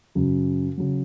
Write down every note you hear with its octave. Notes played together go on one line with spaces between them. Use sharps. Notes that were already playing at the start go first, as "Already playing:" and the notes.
F#2 C#3 F#3
C#3 F#3